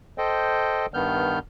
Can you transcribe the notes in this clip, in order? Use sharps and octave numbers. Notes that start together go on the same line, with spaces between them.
A4 C5 D#5 G5
G2 D#3 B3 F6 G6